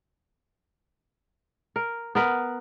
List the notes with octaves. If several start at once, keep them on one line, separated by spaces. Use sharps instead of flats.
A#4
B3 A#4 B4